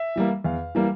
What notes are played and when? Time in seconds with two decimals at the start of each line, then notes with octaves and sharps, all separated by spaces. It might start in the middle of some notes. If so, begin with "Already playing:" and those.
Already playing: E5
0.16 E3 G3 A#3
0.44 E2 F5
0.75 E3 G3 A#3